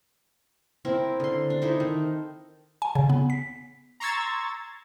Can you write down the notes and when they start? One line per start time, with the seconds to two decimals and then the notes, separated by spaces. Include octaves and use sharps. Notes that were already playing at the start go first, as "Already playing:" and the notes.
0.85 C4 E4 A#4
1.20 D3 C6
1.50 D4
1.62 D#4 E4 A4 C5
1.80 D#3
2.82 G#5
2.95 C#3
3.10 B3
3.30 B6
4.00 A#5 C6 C#6 E6 G#6 A6